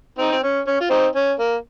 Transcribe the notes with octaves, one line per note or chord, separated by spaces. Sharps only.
C4 D#4
C4
C#4
C#4
F4
C4 D#4
C#4
A#3